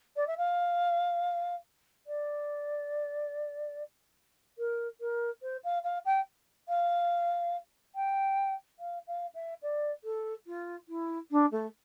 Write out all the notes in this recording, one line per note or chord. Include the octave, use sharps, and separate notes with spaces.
D5
E5
F5
D5
A#4
A#4
C5
F5
F5
G5
F5
G5
F5
F5
E5
D5
A4
F4
E4
D4
A3